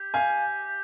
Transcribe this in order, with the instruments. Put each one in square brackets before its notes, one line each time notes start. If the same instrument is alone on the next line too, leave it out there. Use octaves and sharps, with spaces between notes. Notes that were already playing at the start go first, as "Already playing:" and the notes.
Already playing: [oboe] G4
[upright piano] F5 G#5